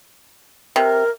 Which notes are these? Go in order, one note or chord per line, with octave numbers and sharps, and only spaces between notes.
C3 A#4